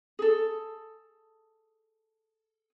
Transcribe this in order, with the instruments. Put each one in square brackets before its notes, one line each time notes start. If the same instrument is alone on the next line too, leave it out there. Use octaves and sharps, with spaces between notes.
[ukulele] G#4 A4